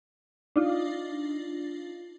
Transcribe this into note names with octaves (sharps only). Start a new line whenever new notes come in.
D4 D#4 F4